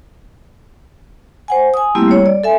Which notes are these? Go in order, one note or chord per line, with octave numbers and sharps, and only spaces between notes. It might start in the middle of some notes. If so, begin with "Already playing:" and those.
C5 F#5 G#5
G#5 D#6
G3 A3 A#3 C4 E4 G4
G3 C#5
D5
A4 E5 G#5